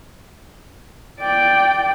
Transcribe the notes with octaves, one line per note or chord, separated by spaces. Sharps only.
D5 G5